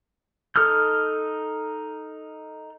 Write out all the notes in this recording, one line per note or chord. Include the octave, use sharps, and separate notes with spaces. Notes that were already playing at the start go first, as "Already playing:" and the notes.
D#4 A4 D#6 F6 G6